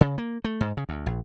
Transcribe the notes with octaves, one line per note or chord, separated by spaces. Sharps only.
C#3
A#3
A3
G#2
C#3
D2
A#1